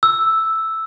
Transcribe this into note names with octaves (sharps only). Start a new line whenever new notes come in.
E6